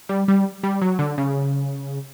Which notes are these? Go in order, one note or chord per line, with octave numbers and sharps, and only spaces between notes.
G3
G3
G3
F#3
D3
C#3